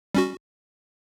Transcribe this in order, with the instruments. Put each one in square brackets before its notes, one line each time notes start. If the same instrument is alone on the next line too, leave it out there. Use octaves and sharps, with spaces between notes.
[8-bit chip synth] G3 C#4 F#4